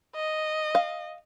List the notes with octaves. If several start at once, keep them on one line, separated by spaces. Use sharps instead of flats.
D#5
F5